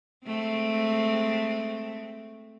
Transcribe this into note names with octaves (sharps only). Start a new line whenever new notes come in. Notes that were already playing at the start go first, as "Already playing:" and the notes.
G#3 A3 C4